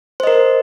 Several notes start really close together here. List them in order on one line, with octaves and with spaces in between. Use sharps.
C5 D#5 A#4